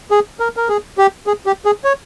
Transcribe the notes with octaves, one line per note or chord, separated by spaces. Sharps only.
G#4
A#4
A#4
G#4
G4
G#4
G4
G#4
C#5